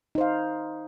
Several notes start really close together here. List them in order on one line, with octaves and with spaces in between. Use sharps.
D#4 C5 F5